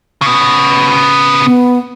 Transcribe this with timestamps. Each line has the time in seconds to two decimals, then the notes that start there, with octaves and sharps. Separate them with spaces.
0.22 C#3 B3
1.45 B3